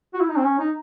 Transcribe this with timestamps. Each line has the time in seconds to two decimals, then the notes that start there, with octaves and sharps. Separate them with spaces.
0.14 F#4
0.21 E4
0.28 D#4
0.37 C4
0.44 C#4
0.59 D#4